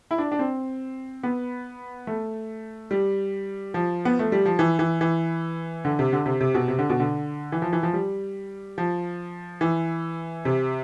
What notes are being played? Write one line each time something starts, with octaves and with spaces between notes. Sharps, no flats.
E4
D4
D4
C4
B3
A3
G3
F3
B3
A3
G3
F3
E3
E3
E3
D3
C3
D3
C3
C3
B2
C3
D3
B2
D3
E3
F3
E3
F3
G3
F3
E3
C3